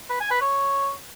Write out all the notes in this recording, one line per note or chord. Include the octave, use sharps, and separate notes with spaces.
B4
G#5
B4
C#5